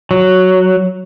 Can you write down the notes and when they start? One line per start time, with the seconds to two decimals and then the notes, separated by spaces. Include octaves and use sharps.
0.11 F#3